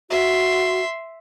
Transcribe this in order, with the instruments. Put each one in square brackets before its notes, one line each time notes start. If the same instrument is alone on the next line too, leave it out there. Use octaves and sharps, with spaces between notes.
[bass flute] F#4 [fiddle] E5 C6